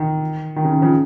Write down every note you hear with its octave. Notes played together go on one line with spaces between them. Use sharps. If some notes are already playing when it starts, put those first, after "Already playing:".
Already playing: D#3
D#3
C#3
D#3
C#3 F3